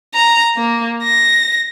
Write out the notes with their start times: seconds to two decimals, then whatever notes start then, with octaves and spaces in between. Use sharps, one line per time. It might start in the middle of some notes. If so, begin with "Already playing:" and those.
0.14 A#5
0.57 A#3
1.03 A#6